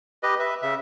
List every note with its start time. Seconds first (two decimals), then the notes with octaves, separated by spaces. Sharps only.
0.23 G4 B4 D#5
0.39 B4 E5
0.62 C#3 E5